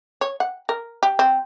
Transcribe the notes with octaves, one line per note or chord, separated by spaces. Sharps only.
C#5
F#5
A#4
G4
C4